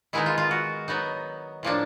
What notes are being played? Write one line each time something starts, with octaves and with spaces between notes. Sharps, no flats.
D#3 G#3 B3 D#4 E4
F4
F4
F#4
F#3 B3 D#4
A2 F3 A#3 D4